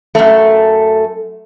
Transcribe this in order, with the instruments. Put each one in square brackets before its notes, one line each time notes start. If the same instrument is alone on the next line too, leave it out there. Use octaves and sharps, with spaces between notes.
[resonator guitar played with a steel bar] F#2 A3